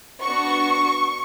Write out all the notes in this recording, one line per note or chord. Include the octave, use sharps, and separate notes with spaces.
B3 D4 F#4 C#6